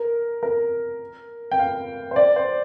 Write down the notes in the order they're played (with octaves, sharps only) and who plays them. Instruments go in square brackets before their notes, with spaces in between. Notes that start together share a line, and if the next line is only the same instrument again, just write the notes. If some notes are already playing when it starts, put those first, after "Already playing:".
Already playing: [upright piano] A#4
A#4
G5
F5
C5
D5
C5